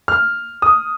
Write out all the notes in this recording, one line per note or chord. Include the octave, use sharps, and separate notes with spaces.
F6
D#6